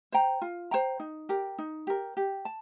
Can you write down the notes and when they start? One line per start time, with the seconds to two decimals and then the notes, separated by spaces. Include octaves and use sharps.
0.12 C5 G5 A#5
0.42 F4
0.71 C5 G5 A#5
1.00 D#4
1.29 G4 A#4
1.59 D#4
1.87 G4 A#4
2.17 G4
2.45 A5